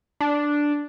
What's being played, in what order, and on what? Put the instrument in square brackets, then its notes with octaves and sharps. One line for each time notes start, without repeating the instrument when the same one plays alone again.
[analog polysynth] D4